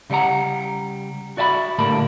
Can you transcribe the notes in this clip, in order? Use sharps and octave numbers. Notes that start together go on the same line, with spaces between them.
C#3 G3 C#5 F#5 A#5
F#4 D5 E5 F5 B5
A2 D3 G3 A#3 D4 B5